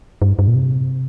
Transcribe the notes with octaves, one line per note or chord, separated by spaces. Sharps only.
G2
G2
A#2
C3